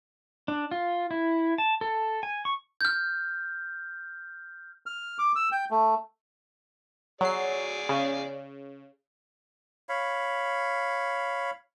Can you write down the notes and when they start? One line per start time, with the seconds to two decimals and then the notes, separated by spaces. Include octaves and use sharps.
0.48 D4
0.71 F4
1.11 E4
1.58 A5
1.81 A4
2.23 G#5
2.45 C#6
2.81 F6 G6
4.86 F6
5.19 D6
5.36 E6
5.52 G5
5.71 A3
7.21 F#3 G#4 D5 C7
7.89 C#3
9.89 C#5 F5 B5